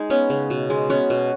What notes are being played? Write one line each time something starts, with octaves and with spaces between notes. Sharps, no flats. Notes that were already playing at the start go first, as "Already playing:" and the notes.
Already playing: G#3 D#4 G#4
B3 C#4
C#3
B2
G#3
B3 C#4 F#4
B2